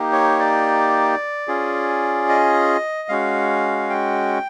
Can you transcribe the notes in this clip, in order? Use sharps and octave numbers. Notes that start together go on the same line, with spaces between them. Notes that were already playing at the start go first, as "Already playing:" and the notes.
Already playing: A#3 D#4 G4
C#5
D5
C#4 F4 G#4
D#5
G#3 C#4 F#4 F5
G5